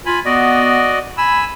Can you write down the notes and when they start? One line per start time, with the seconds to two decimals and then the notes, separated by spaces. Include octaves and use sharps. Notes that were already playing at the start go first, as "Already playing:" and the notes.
0.06 F4 G#5 B5
0.25 B3 F#4 D5 D#5
1.18 G#5 B5 E6